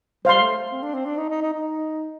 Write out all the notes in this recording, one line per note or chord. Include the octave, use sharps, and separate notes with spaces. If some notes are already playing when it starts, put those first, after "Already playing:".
G3 C5 F5 C6
A3
C4
D4
C4
D4
D#4
D#4
D#4
D#4